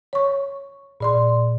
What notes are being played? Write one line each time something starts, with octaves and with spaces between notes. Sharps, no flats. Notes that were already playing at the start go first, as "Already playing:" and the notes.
C#5 C#6
A#2 D5 C6